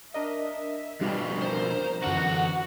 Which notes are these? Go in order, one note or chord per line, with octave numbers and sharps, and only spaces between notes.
D4 A#4 D#5 E5
F2 B2 G3 D4 F4
A#4 C5
F#2 D3 E3 F4 F#4 A4 F#5